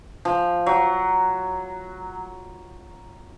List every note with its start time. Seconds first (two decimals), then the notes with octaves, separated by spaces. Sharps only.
0.25 F3
0.66 F#3